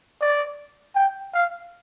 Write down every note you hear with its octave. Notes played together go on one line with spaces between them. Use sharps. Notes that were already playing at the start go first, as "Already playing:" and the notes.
D5
G5
F5